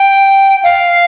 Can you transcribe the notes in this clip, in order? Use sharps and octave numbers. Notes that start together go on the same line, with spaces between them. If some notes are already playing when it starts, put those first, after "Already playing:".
Already playing: G5
F5